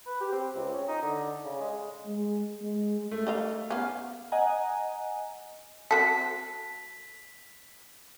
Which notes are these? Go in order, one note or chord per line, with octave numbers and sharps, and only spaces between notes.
B4
G4
C4
C#2
C#4
D#4
D3
C#3
G#3
G#3
G#3
A3
D#3 D#5 F5
B3 C#4 F5
D#5 F#5 G#5 A#5
C4 F#4 A4 B6